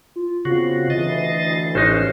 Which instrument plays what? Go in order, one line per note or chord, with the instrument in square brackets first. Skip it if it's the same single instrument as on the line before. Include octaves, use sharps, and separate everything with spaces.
[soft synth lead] F4
[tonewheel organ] C#3 F#4 [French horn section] B3 C4 F4 [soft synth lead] C7
[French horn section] D2 E3 [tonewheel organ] D#5 A6
[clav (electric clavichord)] A1 D#4 [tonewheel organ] C#4 C5 [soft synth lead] F#6